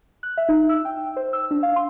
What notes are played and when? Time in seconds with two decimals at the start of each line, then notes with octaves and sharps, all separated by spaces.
0.23 F#6
0.37 E5
0.49 D#4
0.69 E6
0.85 G5
1.17 C5
1.33 E6
1.51 D4
1.63 F5
1.76 C6